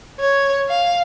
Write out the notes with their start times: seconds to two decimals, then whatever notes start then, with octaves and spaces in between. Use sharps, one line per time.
0.20 C#5
0.69 F5